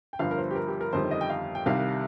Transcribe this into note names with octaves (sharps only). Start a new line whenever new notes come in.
G5
G1 G2 F3 F5
A#4
C5
G4
A#4
G4
A#4
G1 F2 D#3 G3 C5
D#5
G5
F5
G5
C2 C3 D#3 G3 F5